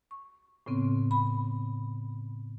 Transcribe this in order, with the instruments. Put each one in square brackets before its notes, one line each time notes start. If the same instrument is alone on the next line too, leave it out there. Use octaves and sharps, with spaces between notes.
[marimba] C#6
A2 C#3 B3 C4
B5